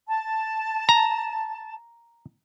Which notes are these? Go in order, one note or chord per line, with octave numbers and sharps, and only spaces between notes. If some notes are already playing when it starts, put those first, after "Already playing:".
A5
A#5